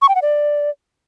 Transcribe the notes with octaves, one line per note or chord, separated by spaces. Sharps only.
C#6
G5
F#5
D5